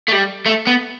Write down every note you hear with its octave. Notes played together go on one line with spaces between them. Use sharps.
A3
G3
A3
B3